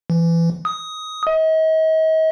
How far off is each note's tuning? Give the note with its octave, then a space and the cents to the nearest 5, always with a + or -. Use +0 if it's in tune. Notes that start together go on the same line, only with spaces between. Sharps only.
E3 +25
D#6 +15
D#5 +40